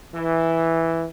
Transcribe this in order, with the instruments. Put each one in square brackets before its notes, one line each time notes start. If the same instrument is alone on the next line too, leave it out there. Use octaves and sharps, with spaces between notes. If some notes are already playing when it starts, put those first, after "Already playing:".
[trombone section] E3